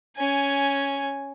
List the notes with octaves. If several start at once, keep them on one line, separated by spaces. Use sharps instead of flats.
C#4 G#5